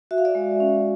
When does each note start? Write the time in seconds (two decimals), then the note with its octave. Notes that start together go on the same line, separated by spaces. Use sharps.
0.11 F#4 E5
0.18 F5
0.25 D5 E5
0.35 G#3
0.60 C#4